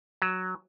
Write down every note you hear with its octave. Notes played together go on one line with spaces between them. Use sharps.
F#3